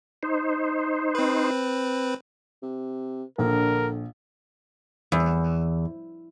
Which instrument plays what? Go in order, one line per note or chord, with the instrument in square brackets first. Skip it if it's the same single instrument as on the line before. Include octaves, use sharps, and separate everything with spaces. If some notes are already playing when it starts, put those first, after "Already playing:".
[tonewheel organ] D#4 C5
[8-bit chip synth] C4 B4
[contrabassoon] C3
[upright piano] A#1 [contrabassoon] D3 [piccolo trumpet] A#4
[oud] E2